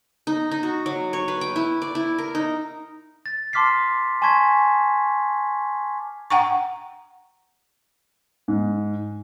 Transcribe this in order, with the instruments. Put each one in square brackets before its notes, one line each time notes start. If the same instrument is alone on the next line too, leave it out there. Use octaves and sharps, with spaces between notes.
[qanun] D#4
D#4
F#4
F#3
C#5
B4
G5
E4
D5
E4
A#4
D#4
[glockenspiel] A6
A5 C6 D6 F6 B6 C7
G#5 A5 C6 C#6 G#6 B6
[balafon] F#5 G5 A#5 C#6
[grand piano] G#2